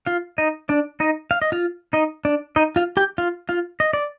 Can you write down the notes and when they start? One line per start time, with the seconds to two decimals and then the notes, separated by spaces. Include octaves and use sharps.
0.06 F4 F5
0.38 D#4 D#5
0.69 D4 D5
1.00 D#4 D#5
1.31 F5
1.42 D#5
1.52 F4 F5
1.93 D#4 D#5
2.25 D4 D5
2.56 D#4 D#5
2.76 F4 F5
2.97 G4 G5
3.18 F4 F5
3.49 F4 F5
3.80 D#5
3.93 D5